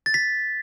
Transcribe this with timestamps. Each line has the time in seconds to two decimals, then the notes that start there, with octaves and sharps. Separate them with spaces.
0.06 A6
0.14 B6